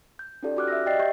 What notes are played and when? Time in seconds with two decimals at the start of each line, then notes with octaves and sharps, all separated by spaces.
0.19 G6
0.43 C#4 D#4 F4 G4 A4 D5
0.56 C#4 F#4 G4 D6 F6 F#6
0.68 E5 E6 A#6
0.86 G4 D5 D#5 G5 A6 C7
0.99 G4 D5 E5 C#6 G6